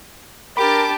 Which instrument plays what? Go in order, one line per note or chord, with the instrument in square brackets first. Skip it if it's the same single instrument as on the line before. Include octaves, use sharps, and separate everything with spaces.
[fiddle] D4 G4 [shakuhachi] A#4 [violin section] A5 D6 [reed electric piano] B5